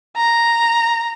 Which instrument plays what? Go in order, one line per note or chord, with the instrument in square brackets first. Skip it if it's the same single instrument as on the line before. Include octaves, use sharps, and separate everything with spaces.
[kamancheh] A#5